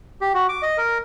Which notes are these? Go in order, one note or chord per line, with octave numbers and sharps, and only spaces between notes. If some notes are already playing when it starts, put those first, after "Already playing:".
G4
F#4
D6
D#5
A#4